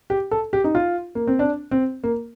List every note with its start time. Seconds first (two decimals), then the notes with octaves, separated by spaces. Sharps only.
0.10 G4
0.31 A4
0.53 G4
0.64 D#4
0.75 F4
1.15 A#3
1.27 C4
1.39 D4
1.71 C4
2.04 A#3